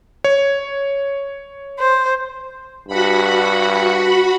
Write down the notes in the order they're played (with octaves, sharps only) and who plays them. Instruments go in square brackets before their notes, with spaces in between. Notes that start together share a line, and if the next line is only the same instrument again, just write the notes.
[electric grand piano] C#5
[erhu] C5
[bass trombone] G2 [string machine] F#4 F#5 B5